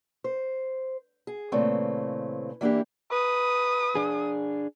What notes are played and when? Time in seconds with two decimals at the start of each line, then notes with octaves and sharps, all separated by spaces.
0.24 C5
1.27 G#4
1.52 A#2 C#3 E3 A3 C4
2.61 E3 A#3 D4 E4 G4
3.12 B4 D#6
3.95 D4 G#4